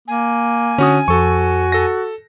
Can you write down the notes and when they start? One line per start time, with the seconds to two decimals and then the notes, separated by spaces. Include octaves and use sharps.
0.08 A#3 G#5
0.78 D3 C#4 F#4 D#6
1.08 F2 F#4 A4 C#6
1.72 A4 A#6